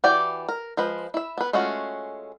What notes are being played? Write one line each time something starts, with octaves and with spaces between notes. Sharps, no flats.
E3 F#4 G4 D5 G5
A#4
F3 G#3 B4
E4 E5
B3 B4
G#3 A3 C#4 F4 F#4